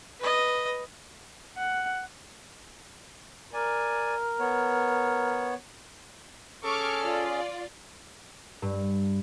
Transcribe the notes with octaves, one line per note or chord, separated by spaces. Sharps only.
B4 D#5
F#5
A#4 D5 G#5
B3 C#5
C#4 G#4 A4 C#6 D6 F6
F4 D5
G2